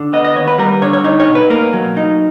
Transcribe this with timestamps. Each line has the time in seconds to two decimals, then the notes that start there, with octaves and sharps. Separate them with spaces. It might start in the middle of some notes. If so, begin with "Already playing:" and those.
Already playing: D3
0.13 B3 D#5
0.24 D#5
0.36 D#2 C#5
0.47 B4
0.58 G3 A#4
0.82 D3 C#5
0.93 C#5
1.04 D#4 C#5
1.20 C#5
1.28 B2
1.35 B4
1.50 A#3 A#4
1.73 F#3
1.97 D#4